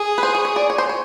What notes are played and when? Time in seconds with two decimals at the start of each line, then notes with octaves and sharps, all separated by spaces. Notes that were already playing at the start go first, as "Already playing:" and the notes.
Already playing: G#4
0.18 B4
0.23 C5
0.35 C#5
0.45 C#5
0.56 D5
0.70 C#5
0.78 C5
0.89 C#5